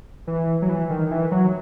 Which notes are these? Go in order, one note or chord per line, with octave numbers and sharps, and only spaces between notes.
E3
F#3
E3
D#3
E3
F#3